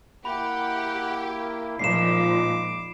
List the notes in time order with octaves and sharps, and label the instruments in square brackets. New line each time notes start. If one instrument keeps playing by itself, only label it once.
[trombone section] A#3 E4 [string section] G4 [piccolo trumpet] F#5 [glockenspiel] B5
[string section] A#2 F3 [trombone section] G#3 D#4 [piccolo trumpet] D6 [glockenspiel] C7 E7